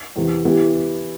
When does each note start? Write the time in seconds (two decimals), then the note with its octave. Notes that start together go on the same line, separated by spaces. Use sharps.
0.16 E2 C3 E3
0.45 E3 B3 E4 G4